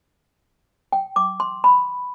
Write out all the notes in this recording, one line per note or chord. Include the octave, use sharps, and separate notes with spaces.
G5
D6
C6
B5